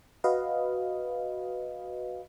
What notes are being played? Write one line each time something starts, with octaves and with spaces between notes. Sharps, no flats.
F#4 B4 D#5 F5